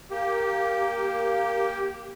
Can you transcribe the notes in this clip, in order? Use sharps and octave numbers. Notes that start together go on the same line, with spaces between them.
A#3 G4